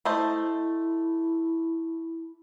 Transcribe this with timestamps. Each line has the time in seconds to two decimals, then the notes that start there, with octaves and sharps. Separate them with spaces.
0.05 A3 E4 C5 D#5